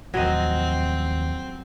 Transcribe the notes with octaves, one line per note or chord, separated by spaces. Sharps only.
D#2 A2 F3 F#3 C4 D#5